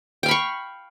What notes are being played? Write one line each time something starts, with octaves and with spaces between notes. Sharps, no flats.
F5 G5 B5 C#6